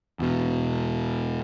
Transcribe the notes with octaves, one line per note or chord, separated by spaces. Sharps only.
E2 B2